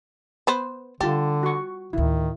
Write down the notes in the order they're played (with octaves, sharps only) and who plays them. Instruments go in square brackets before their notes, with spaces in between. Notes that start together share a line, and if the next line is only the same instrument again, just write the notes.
[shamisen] B3 B4 C5
[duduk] D3 [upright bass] G3 [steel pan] F4 A5 [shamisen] G4
[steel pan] F#4 C#6
[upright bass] D2 A2 [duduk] D#3 [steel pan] E4